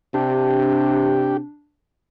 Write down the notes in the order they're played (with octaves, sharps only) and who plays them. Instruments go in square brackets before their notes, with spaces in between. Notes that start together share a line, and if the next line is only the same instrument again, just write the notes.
[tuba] C3 [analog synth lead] D4 [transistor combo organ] G4